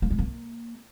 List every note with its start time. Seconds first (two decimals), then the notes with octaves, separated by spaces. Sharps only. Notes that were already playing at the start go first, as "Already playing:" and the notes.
0.02 A#3
0.10 G#3
0.18 A#3